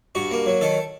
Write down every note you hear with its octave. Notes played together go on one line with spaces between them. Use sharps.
G2 F#4
A#3
F#3
D#3 A4